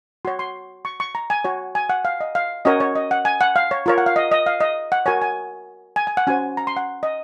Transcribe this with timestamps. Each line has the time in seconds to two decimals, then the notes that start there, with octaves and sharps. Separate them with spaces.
0.25 F#4 C#5 C6
0.39 C6
0.85 C#6
1.00 C#6
1.15 A#5
1.30 G#5
1.44 F#4 C#5
1.75 G#5
1.90 F#5
2.05 F5
2.21 D#5
2.35 F5
2.65 C#4 F#4 A#4 C#5 D#5
2.80 C#5
2.95 D#5
3.11 F#5
3.25 G#5
3.41 F#5
3.56 F5
3.71 C#5
3.86 F4 A#4 C#5
3.98 F#5
4.06 F5
4.16 D#5
4.32 D#5
4.46 F5
4.60 D#5
4.92 F#5
5.06 F#4 A#4 C#5 G#5
5.22 G#5
5.96 G#5
6.07 G#5
6.17 F#5
6.27 C#4 F#4 C5 G#5
6.57 A#5
6.67 C6
6.76 F#5
7.03 D#5